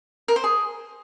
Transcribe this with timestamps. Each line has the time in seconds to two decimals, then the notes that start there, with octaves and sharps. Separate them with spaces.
0.28 A#4
0.36 C5
0.44 G#4